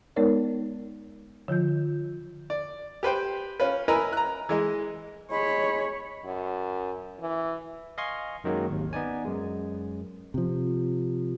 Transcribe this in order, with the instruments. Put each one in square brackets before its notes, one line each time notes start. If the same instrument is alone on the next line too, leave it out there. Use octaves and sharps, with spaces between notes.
[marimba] G#3 B3 D#4 A#4 C#5 D5
D3 F3 F4 G6
[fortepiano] D5
G4 B4 C5 G5
C#4 F4 B4
E4 A#4 B4 D#5 G#5 A#5
A#5 F#6
E3 G#3 D#5
[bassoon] G#3 [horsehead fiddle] C#5 [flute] B5
[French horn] F#2
E3
[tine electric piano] D#5 F5 G#5 C6 C#6
F#2 D#3 F#3 G#3 A#3
G#1 D#2
B3 D#4 D5 G#5
F#2 G#3
[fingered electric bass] C3 F3